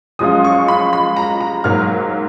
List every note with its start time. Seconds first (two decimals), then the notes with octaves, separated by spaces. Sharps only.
0.19 F#2 F3 G#3 C#4 F4 D#6
0.44 C#6
0.68 B5
0.93 B5
1.16 A#5
1.40 A#5
1.64 G#2 F#3 A#3 F6